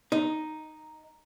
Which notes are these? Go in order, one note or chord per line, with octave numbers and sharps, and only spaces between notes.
D#4